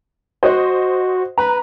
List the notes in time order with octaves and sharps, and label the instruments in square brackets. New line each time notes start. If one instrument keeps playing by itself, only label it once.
[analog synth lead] F#4 [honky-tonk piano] C5 D#5
[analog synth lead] B4 [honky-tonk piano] A#5